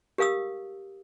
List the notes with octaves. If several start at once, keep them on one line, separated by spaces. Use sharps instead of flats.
G4 A#4 F5 D#6 E6